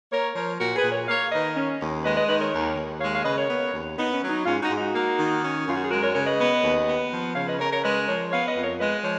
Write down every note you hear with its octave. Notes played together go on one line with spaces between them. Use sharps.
A#3 A#4 C#5
F3 A#4 C#5
A#2 F#4 A#4
G#4 B4
A#2
A#4 C#5
A#3 C#5 F5
D#3 B4 D#5
C#4
D#2
G#3 B4 D#5
B4 D#5
D#3 B4 D#5
A#4 C#5
D#2
D#2
G#3 C#5 F5
C#5 F5
C#3 B4 D#5
A#4 C#5
B3
D#2
B3 D#4
C#4
F#3
D#4
G#2 C#4 F4
D#4 F#4
G#2
D#4 F#4
A#3
D#3
C#4
F#2 F4
F#4
G#4
G#3 F#4 A#4
A#4 C#5
C#3 A#4 C#5
B4 D#5
B3
D#2
B3
F3
C#3 C#5 F5
B4 D#5
C#3 A#4 C#5
A#4 C#5
G#3 B4 D#5
F3 A#4 C#5
B3 C#5 F5
B4 D#5
F2
A#4 C#5
G#3 B4 D#5
F3 C#5